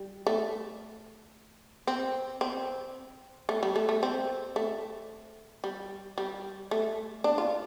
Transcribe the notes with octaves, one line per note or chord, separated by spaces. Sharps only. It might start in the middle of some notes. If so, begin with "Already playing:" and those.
Already playing: G3
A3
C4
C4
A3
G3
A3
A3
C4
A3
G3
G3
A3
D4
F4